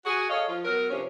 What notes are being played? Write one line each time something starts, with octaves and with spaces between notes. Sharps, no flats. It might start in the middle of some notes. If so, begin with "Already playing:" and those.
F#4 G#4
G#4 A4 C#5 D#5 F5
F3 F4
F#3 B3 A#4
G2 C3 F3 C#4